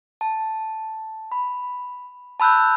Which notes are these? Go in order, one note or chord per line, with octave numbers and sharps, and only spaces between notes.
A5
B5
A5 B5 E6 F#6 G6